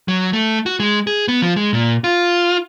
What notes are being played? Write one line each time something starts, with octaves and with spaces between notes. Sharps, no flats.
F#3
A3
F#4
G#3
G#4
B3
F3
G#3
A#2
F4